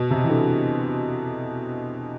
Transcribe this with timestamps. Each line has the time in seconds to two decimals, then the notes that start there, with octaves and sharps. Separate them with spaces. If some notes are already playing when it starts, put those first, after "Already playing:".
Already playing: B2
0.10 C3
0.24 E3
0.29 D3